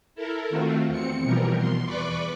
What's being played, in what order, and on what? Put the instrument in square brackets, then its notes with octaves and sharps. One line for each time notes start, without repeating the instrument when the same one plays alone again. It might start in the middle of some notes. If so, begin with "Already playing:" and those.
[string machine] E4 A4 A#4
D#3 A3 C4 F4 F#4
E2 C4 C#7
B2 E3 F3 G3 A#4
B2 C6
E2 B4 D5 B5 C#6 D6